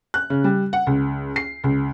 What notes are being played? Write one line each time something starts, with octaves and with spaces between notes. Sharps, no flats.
F#6
C#3
G3
F#5
C#2
C7
C#2